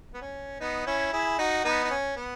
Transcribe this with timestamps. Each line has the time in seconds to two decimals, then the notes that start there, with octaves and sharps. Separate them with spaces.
0.14 B3
0.21 C#4
0.60 B3 D#4
0.86 C#4 E4
1.13 E4 G#4
1.38 D#4 F#4
1.64 B3 D#4
1.84 D#4
1.90 C#4
2.16 B3